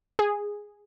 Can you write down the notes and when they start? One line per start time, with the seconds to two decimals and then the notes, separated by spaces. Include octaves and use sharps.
0.19 G#4